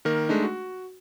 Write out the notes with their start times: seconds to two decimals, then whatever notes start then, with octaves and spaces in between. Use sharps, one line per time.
0.05 D#3 A#3 A#4
0.29 G#3 A3 D4 D#4
0.44 F#4